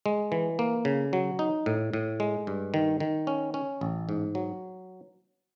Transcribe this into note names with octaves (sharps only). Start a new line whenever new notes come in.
G#3
E3
A#3
C#3
F#3
D#4
A2
A2
G#3
G2
D#3
D#3
C#4
C#4
A1
G#2
F#3